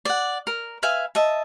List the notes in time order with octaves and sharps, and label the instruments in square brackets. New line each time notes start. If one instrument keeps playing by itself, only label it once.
[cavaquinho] D5 F#5
A#4
B4 E5 F5 G#5
D#5 E5 A5